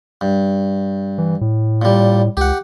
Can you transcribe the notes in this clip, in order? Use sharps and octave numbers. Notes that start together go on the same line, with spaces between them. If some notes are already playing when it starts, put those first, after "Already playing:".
G2
E3
A2
A#2 G3
C#2 G4 F#5